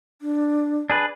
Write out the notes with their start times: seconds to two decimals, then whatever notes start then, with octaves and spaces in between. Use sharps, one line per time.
0.22 D4
0.90 D4 G#4 B4